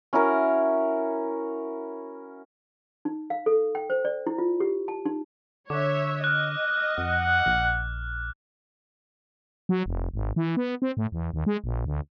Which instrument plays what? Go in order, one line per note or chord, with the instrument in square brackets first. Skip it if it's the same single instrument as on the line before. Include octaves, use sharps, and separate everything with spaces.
[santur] C#4 E4 F#4 A#4
[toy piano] D#4
F5
A4
G5
C5
D5
E4
F4
G4
A5
D#4
[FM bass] D3 [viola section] C#5 E5 [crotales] D6 F#6
[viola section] D#5 [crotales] F6 F#6
[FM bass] F2 [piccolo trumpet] F#5
[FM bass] A#1
F#3
F1
G#1
E3
B3
C4
A2
E2
D#2
G#3
A#1
D2